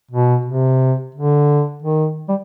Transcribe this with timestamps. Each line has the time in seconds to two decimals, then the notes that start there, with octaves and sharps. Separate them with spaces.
0.11 B2
0.46 C3
1.15 D3
1.83 D#3
2.29 G3